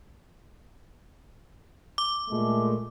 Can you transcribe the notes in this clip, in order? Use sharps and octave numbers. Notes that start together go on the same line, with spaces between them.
D6
A#2 G#3 A3